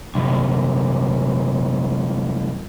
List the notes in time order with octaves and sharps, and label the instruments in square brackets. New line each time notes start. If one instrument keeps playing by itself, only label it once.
[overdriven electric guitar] C2 F#2